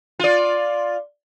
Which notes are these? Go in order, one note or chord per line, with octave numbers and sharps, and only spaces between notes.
F4 D5